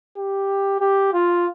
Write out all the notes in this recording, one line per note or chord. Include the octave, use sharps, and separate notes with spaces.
G4
G4
F4